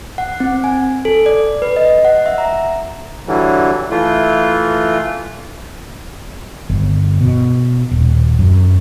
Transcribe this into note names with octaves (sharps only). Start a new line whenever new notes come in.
F#5
C4
G#5
A4
D5
B4
D#5
F#5
E5
A#5
D3 E3 F#3 G3
E3 A3 F4
G1
B2
D#1
F#2